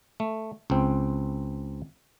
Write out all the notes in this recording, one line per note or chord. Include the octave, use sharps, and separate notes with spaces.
A3
C#2 C4